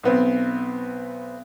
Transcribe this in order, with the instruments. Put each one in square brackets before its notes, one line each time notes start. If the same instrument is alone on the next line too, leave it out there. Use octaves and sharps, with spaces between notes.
[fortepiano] B1 B3 C4